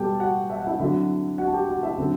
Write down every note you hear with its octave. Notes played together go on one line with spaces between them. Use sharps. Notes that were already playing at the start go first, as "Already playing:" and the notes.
Already playing: B2 G3 B3 G4 A4 G5 A5
F#4 F#5
E5
F#5
E4 E5
D3 F#3 C4 E4 E5
F#4 F#5
A5
G4 G5
F#4 F#5
E4 E5
D3 F#3 C4